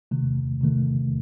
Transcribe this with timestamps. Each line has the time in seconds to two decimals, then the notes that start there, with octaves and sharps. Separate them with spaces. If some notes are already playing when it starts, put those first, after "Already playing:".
0.11 C3 D#3 A3
0.61 C3 D#3 A3